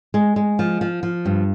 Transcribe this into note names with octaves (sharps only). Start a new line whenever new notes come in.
G#3
G#3
F3
F3
F3
G2